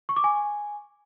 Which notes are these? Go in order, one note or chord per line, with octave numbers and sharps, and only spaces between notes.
C#6
D6
G#5